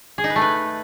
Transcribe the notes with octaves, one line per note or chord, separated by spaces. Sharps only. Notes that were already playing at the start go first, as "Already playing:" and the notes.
G#4
D#4
B4
A3
B4